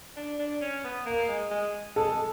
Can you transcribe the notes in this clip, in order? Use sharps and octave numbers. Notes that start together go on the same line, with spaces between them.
D4
D4
C#4
B3
A#3
G#3
G#3
G#3 A4
G#3